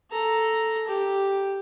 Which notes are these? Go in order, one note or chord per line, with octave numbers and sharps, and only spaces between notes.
A4 A#5
G4